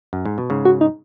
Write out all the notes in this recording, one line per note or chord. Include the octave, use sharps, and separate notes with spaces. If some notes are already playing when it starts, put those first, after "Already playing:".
F#2
G#2
B2
G#2 C#3
F#4
D#4